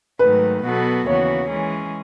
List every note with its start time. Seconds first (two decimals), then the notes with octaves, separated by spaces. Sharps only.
0.19 G#2 D#3 F#3 A3 B4
0.63 B2 F#3 B3 F#4 A4
1.06 D#2 C#3 E3 B3 F#4 C#5
1.49 E3 G#3 C#4 G#4